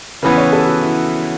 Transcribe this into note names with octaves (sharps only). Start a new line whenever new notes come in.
C#3 E3 B3 B4
C#5
A4
F#4
E4